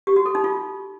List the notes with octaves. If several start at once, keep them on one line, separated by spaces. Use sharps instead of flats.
G4
F#4
A4
D#4
F4